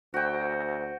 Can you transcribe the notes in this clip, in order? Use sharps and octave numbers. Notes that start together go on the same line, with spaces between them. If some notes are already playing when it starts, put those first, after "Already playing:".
D2 F#4 C5 G5